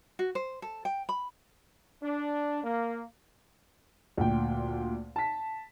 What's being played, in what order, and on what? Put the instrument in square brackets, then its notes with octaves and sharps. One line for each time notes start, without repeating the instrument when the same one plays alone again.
[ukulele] F#4
C5
A4
G5
B5
[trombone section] D4
A#3
[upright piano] D2 A#2 G5
A5 B6